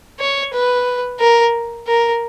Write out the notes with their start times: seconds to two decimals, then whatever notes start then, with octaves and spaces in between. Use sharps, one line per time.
0.20 C#5
0.53 B4
1.20 A#4
1.87 A#4